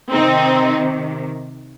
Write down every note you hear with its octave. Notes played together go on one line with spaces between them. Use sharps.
C3 D#3 C4 D#4